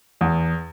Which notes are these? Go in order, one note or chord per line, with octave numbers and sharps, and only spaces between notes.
E2